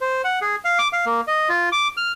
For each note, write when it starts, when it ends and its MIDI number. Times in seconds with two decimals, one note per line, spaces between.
0.01 0.22 72
0.24 0.39 78
0.42 0.56 68
0.65 0.78 77
0.79 0.88 86
0.93 1.05 77
1.06 1.21 58
1.27 1.49 75
1.49 1.69 65
1.72 1.88 86
1.97 2.12 89